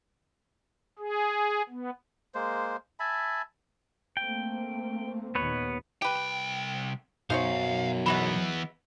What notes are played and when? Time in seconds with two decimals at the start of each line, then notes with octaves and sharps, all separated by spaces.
0.99 G#4
1.69 B3
2.34 G#3 A#3 C5
3.00 E5 G#5 A5 B5
4.17 A3 A#3 C4 G5
5.35 D#2 A#2 D#3 B3 B4 C#5
6.02 C2 G4 B4 G5
7.30 B1 F#2 D#4 C5 C#5 F5
8.06 E3 G#3 B3 F#4 B5